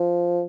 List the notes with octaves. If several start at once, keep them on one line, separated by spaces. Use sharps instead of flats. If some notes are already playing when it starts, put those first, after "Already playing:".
Already playing: F3